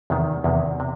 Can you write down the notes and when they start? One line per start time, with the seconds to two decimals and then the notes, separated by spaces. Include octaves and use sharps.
0.10 E2 C3 D#3
0.44 E2 C3 D#3
0.80 C3